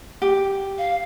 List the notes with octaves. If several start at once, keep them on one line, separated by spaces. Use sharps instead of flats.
G4
F5